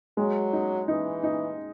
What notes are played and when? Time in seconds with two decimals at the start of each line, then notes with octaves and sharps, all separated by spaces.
0.17 F#3 G#3
0.53 D#4
0.88 E3 D#4
1.23 D#4